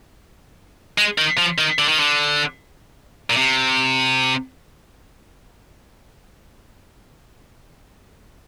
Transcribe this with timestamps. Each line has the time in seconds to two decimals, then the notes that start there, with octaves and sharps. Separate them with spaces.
0.98 G#3
1.18 D#3
1.38 F3
1.58 D#3
1.78 D3
1.88 D#3
2.00 D3
3.30 A#2
3.37 C3